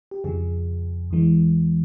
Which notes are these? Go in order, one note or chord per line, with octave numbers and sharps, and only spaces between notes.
G4
F2 C#3 F3 G#4
E2 E3 G#3